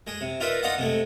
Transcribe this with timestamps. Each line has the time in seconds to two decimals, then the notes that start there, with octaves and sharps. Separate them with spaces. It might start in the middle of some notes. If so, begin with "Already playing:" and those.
0.07 G#3 G#4
0.21 C3
0.40 D#4 F4 A#4 B4 D5 E5
0.63 D#4 F4 D5 D#5 F5 F#5
0.78 C3 G#3 A3